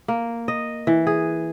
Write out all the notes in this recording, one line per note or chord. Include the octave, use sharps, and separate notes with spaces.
A#3
D#5
E3
G#4